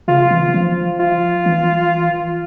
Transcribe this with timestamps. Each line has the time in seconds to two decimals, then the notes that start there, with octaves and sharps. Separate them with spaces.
0.08 C#3 F4
0.31 E3
0.54 F3
1.00 F4
1.46 E3